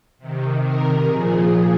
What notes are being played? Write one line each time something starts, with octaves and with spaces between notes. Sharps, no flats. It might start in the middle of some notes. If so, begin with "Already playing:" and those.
C3 D#3
A#4
A#2 F3 G#4